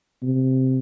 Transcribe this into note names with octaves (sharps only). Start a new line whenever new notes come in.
C3